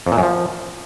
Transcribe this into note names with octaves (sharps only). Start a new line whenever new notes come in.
F2
A#2
F#2
F3